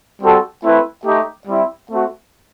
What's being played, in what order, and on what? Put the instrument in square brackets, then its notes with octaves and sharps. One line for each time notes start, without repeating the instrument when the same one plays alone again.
[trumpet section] G3 C4 F#4 A4
A3 C4 E4 B4
A3 D#4 G4
G3 C4 E4
A3 C4 F#4